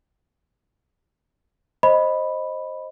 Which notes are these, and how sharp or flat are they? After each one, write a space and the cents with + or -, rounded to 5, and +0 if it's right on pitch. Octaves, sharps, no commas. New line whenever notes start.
C5 +15 D#5 +0 B5 +0